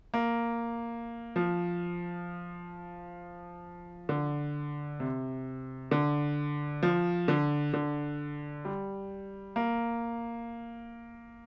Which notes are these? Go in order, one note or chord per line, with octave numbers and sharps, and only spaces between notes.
A#3
F3
D3
C3
D3
F3
D3
D3
G3
A#3